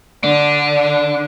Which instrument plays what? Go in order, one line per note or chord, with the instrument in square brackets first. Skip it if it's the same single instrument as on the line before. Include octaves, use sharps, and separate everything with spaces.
[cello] D3 [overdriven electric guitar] D4